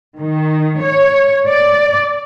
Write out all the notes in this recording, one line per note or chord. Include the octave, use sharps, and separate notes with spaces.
D#3
C#5
D5